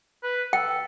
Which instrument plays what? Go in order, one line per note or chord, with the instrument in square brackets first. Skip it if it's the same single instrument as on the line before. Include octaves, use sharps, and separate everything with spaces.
[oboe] B4
[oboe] A4 [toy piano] G5